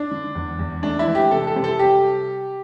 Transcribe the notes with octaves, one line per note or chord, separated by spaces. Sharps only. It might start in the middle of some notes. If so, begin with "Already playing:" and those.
Already playing: D4
D3
E2
E2
A3 D4
E4
E3
G4
C3 A4
A4
C3
A4
G3 G4